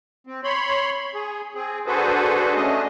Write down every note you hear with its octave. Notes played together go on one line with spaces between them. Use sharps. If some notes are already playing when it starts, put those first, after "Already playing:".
C4
C#5 B5 C6
G#4
C4 G#4
D4 F#4 G#4 A4 B4 C5
A3 C#4 D4 D#5